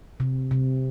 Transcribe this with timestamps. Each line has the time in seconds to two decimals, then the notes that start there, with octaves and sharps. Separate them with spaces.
0.20 C3
0.51 C3